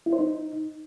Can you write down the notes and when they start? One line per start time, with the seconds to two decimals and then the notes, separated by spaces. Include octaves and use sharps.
0.06 E4
0.13 C5
0.19 D#4